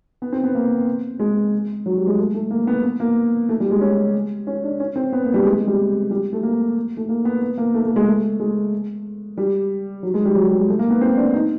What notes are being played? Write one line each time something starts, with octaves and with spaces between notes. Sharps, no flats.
B3
C4
B3
A#3
G#3
F#3
G3
G#3
A3
A3
A#3
B3
B3
A#3
A3
G3
G#3
C#4
C#4
D4
C#4
C4
B3
A#3
G3
G#3
G#3
G3
G3
A3
A#3
A3
A#3
B3
B3
A#3
A3
A3
G#3
A3
G#3
G3
F#3
G#3
G3
F#3
G3
G#3
A3
A#3
B3
C4
D4
D#4